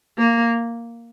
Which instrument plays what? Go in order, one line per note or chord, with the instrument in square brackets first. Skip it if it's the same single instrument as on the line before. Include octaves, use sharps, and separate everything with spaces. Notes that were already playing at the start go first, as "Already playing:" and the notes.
[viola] A#3